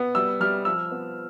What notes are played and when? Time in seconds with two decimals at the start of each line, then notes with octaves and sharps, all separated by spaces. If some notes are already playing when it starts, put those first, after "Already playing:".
Already playing: B3
0.15 G3 E6
0.40 G3 F6
0.65 F3 E6
0.91 B3